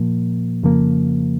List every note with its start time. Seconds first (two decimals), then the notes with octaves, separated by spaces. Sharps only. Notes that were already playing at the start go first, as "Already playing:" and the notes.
Already playing: A#2 F3 A#3
0.63 F2 C#3 F3 A#3